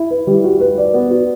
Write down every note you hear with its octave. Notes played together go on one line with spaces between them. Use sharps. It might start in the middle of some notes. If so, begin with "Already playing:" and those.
Already playing: E4
B4
G3
F#4
B4
D5
B3
F#4